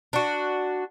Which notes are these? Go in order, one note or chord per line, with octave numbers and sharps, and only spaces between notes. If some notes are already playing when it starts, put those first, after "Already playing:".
D4 F#4